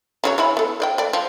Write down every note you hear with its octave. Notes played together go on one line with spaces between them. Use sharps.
C#3 F#3 C#5
E3 E4 B5
B3 A4
C5 D5 G5
A3 D5
F3